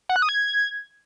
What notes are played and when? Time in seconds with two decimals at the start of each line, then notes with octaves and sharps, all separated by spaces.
0.09 F#5
0.16 F#6
0.22 D#6
0.29 G#6